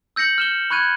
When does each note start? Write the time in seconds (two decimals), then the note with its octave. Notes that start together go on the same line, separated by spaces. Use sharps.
0.16 E6 G6 A#6 C#7 F#7
0.38 F6 E7 G7
0.70 B5 C#6 F#6 G#6 D#7